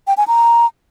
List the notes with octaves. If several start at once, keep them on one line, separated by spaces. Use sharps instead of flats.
G5
G#5
A#5